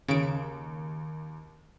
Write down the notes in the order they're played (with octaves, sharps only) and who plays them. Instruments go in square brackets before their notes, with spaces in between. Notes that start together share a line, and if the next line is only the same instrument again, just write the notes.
[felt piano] D#2 [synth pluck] C#3 D7